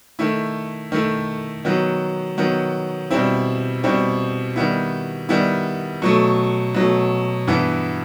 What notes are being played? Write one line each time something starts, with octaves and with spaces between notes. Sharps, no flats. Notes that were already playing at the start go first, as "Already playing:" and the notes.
D#3 A3 E4
D#3 A3 E4
D#3 F#3 B3
D#3 F#3 B3
B2 G3 C4 E4
B2 G3 C4 E4
D#3 G3 B3 E4
D#3 G3 B3 E4
B2 F#3 A3
B2 F#3 A3
G2 E3 B3 E4